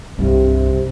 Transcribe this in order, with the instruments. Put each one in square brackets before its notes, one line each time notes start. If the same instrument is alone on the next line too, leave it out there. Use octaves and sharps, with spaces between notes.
[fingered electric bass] C2 G2 [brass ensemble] C3